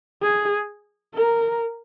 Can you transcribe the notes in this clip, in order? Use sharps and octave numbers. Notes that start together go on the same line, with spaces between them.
G#4
A#4